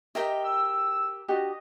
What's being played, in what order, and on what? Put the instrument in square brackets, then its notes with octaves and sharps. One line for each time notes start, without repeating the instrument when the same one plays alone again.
[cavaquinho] G4 A#4 G5 [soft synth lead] D#5 [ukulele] E5
[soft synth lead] E6
[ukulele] D4 F#4 G4 [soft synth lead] D#5